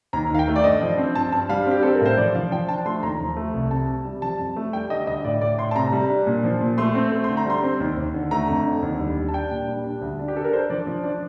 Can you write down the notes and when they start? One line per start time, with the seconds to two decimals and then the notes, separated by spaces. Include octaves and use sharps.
0.13 D#2 A#5
0.30 D#3 F5
0.39 G5
0.48 A3
0.56 D5
0.64 G2 D#5
0.81 F3
0.98 C4
1.15 G2 A5
1.32 G2 A5
1.49 G3 F5
1.66 C4 G4
1.83 C4 A4
1.95 A#4
2.01 A2 C5
2.17 F3 D5
2.35 F3 F5
2.51 F3 G5
2.68 D4 A5
2.86 A3 C6
3.03 D#2 A#5
3.20 F3
3.37 A3
3.54 C2
3.71 C3 A5
3.88 C3
4.05 G3
4.22 F3 A5
4.39 F2
4.56 A3
4.73 G3 G5
4.90 D3 D#5
5.07 D2 D#5
5.24 A2 D5
5.41 A2 D5
5.58 A2 C6
5.71 A5
5.76 C3 A#5
5.93 G3
6.10 D4
6.27 A#2
6.44 F3
6.61 A#2
6.78 A3 C6
6.95 C4
7.12 A3
7.24 D3 C6
7.37 A#5
7.46 G3 C6
7.63 C4
7.80 D#2
7.97 D#2
8.14 D3
8.31 A3 A#5
8.48 F2
8.66 D3
8.82 D#2
8.99 G3
9.16 G3
9.28 A5
9.34 D4 G5
9.51 A#2
9.68 G3
9.84 D4
10.01 D2
10.19 D4
10.28 G4
10.36 D4 A4
10.44 A#4
10.53 D4 C5
10.70 F3 D5
10.87 F3
11.04 D4 D5